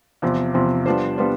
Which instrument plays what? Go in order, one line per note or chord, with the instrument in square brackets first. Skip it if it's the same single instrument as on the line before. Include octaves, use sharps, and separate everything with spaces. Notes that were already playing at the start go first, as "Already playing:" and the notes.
[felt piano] E2 C3 F3 C4
E2 C3 F3 C4
G3 B3 D4 F4 C5
G3 B3 D4 F4 C5